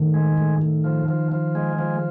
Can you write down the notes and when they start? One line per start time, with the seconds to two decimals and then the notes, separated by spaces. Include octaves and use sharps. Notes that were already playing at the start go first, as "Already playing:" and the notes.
Already playing: A2 D#3
0.14 G#3
0.38 A2
0.62 A2
0.84 F3
1.08 F3
1.32 F3
1.55 G#3
1.79 F3